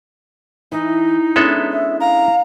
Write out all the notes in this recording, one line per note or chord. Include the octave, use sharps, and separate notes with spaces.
E3 D#4
G#3 B3 C#4 D4 E4 A4
E5
F5 A#5